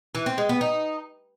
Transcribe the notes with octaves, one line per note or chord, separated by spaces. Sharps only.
E3
C4
G#3
B3
D#4